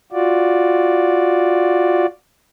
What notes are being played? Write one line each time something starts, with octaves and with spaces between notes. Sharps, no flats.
F4 F#4 D5